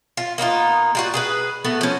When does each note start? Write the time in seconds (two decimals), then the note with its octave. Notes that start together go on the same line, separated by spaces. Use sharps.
0.17 F4
0.38 A#3 B3 D#4 F4
0.95 G3 F4 F#4
1.14 G#4 A#4 B4
1.64 A3 B3 F#4
1.81 F3 C#4